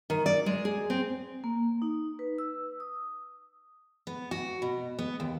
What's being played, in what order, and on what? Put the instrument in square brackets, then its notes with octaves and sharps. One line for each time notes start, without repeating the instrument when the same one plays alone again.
[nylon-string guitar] D#3
D5
G#3
G#4
C4
[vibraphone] A#3
D#4
B4
E6
D#6
[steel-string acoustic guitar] B3
F#4
B2
B3
D#2